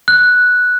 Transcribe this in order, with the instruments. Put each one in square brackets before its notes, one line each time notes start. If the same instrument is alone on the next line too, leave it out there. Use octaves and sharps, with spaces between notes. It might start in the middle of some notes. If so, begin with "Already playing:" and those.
[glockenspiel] F#6